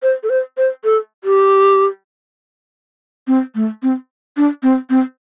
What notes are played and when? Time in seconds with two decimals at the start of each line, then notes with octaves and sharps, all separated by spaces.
0.03 C5
0.23 A4
0.30 C5
0.57 C5
0.84 A4
1.24 G4
3.27 C4
3.55 A3
3.83 C4
4.37 D4
4.63 C4
4.90 C4